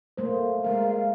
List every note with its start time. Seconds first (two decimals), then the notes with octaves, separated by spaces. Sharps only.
0.17 A3 A#3 C5
0.64 G#3 A#4 F5